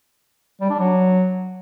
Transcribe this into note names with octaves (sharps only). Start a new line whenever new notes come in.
G3
D4
F#3